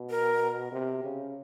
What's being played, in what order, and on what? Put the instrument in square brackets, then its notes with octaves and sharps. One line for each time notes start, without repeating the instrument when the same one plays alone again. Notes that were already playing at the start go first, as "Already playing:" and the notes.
Already playing: [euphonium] B2
[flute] A#4
[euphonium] C3
C#3